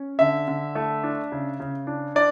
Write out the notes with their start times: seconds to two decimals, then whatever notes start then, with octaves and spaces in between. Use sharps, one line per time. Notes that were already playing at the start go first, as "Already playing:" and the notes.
Already playing: C#4
0.19 D3 E5
0.48 D3
0.75 A3
1.03 D4
1.32 C#3
1.60 C#3
1.87 D4
2.15 D4 D5